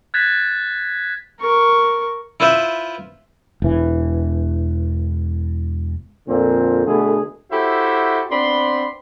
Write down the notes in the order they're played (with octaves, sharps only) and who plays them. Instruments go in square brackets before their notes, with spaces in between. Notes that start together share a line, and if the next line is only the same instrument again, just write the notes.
[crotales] F#6 G#6 A6 B6 E7
[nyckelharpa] A#4 C#6
[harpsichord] E4 F4 B4 C5 E5
[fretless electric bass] E1 E3
[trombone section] F2 A#2 D3 C4
B2 D3 A3 G#4
[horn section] E4 F#4 G4 A4 C5 E5
B3 C4 D4 B5 C6